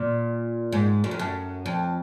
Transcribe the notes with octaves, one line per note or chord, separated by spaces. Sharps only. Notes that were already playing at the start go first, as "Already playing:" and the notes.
Already playing: A#2
G#2
F#2
F2
F#2
F2